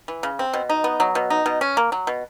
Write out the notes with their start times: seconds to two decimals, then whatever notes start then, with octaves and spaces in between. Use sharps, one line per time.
0.08 E3
0.23 C#3
0.39 C4
0.53 B2
0.69 D#4
0.84 B3
1.00 F#3
1.15 B2
1.30 D#4
1.46 B2
1.61 C#4
1.77 A#3
1.92 F#3
2.07 B2